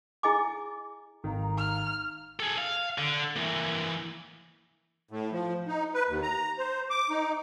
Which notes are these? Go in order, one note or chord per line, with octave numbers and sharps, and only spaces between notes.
E4 G#4 D#5 G#5 D6
G#1 D#3 F5 A#5
F6
G#4 A4
F5
D3
E3 A#3
A2
F3
D#4
B4
D#2
A#5
C5
D6
D#4